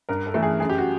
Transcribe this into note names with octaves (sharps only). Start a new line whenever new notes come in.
G2 A#4
A4
E3 A3
G#4
F#2 G#4
G4
F#4